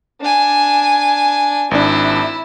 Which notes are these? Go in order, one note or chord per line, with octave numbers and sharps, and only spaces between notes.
D4 G#5
G#1 D4 E4